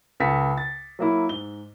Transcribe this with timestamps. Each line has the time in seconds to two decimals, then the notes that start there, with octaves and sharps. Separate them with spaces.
0.20 C#2 A4 B6 C#7
0.57 A6
0.99 F#3 A#3 E4
1.29 G#2 G7